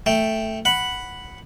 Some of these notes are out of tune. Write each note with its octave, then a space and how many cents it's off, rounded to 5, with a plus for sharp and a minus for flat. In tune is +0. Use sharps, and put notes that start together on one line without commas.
A3 +0 G5 +0
F#5 +0 B5 +0